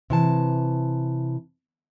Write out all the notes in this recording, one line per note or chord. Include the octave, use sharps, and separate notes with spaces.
C3 E3 A5